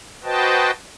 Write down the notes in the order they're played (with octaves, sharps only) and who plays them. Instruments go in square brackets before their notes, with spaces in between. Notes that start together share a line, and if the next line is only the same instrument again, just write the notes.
[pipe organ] F#4 B4 C5 D#5 G5 A5